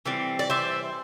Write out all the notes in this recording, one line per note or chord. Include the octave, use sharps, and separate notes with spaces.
E3 G3 C4
D5
C5 E5